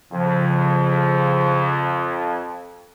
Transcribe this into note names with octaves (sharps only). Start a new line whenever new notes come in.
F2 C#3 F3